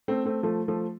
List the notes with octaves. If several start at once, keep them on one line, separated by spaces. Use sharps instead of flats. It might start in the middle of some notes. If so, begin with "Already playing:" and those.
A3 C4
A3 C4
F3 A3
F3 A3